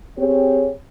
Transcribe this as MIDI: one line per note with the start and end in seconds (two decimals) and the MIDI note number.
0.18 0.70 60
0.18 0.70 67
0.18 0.70 68
0.18 0.70 73